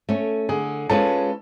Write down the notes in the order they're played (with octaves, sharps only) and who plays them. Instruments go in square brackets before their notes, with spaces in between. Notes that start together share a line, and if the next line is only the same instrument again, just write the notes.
[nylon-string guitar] A3 C#4
[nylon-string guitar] D3 [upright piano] G#4
[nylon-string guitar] G#3 C#4 F4 B4 [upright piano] A4